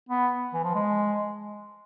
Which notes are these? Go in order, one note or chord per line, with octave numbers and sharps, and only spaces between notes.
B3
E3
F3
G#3